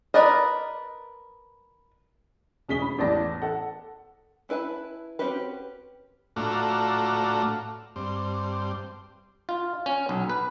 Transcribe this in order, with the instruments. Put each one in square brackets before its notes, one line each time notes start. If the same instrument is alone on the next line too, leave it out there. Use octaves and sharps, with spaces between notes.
[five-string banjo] A#4 B4 D5 D#5
[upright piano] E1 C#4 G#4 B6 G7
B5
A1 E2 D5 A5 A#6
A4 F#5
[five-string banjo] C#4 E4 B4 E5 A5
C4 C#4 F#4 G4 B4
[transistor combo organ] A2 A3 D4 F4 F#4 A#5
G2 C4
[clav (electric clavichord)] F4
C#4
B1
B4